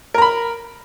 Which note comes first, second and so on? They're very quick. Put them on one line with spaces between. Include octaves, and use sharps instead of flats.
A#4 A#5 B5